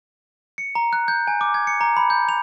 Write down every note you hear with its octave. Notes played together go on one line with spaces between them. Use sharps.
C#7
A#5
F#6
G6
G#5
D6
G#6
C#7
A#5
B5
G6
F7